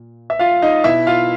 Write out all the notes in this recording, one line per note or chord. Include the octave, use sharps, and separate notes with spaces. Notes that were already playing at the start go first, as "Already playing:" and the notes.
Already playing: A#2
E5
F4 F5
D#4 D#5
B2 E4 E5
F4 F5